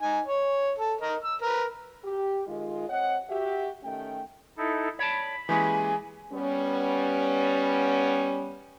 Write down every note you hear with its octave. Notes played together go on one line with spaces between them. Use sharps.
D#4 G#5
C#5
A4
A#4 D#5
E6
A#4 B4
G4
D#3 G#3 F4
C4 C#5 D#5 F#5
F#4 G4 E5
D#3 A3 C#4 G5
D#4 E4 A4
C#5 D5 A5 B5
E3 G#3 A#3 C#4 G4 G#4 G#5
G3 B3 C#4